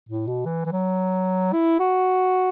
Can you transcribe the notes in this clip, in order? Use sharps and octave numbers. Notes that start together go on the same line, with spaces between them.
A2
B2
E3
E3
F#3
E4
F#4